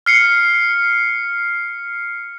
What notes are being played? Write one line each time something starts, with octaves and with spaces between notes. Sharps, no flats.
F6 C7 C#7